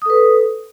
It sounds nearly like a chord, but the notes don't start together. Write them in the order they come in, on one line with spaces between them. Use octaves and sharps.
D#6 A4 B4